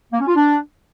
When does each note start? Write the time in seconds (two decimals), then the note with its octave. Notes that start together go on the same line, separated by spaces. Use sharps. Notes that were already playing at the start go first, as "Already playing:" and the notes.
0.13 A#3
0.20 C#4
0.28 F4
0.35 D4